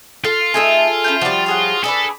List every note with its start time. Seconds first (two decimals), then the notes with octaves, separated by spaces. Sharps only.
0.25 F4 A4
0.54 A3 D#4 G#4 A4 E5 E6
1.04 C#4 E4 G6
1.21 F3 G3 F#4 D5
1.46 F#4 G#4 C#5
1.84 D4 G#4 A4 B4 B5